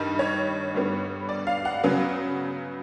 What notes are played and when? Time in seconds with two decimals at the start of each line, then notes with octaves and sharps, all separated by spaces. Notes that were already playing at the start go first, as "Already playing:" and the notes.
Already playing: G2 D#3 G3
0.19 C#5
0.74 G2 D3 G3 B3
1.29 D5
1.47 F5
1.65 F#5
1.84 C#3 F#3 B3